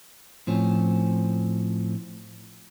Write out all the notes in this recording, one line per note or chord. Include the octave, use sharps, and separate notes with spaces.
A2 F3 C4 C#4